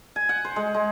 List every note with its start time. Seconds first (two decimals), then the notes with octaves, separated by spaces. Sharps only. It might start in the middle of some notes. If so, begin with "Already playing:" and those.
0.16 G#5
0.29 F#5
0.45 C5
0.56 G#3
0.74 G#3